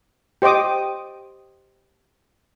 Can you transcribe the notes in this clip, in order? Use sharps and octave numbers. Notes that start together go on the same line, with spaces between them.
G4 C5 D#5 G5 D6 D#6